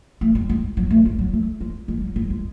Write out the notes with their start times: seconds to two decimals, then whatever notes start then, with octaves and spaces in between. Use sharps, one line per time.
0.21 A3
0.35 G#3
0.49 G#3
0.77 F#3
0.90 A3
1.05 G#3
1.19 F#3
1.33 A3
1.60 G#3
1.88 G#3
2.02 F#3
2.16 G#3
2.30 G#3